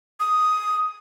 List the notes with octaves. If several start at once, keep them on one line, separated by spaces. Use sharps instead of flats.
D#6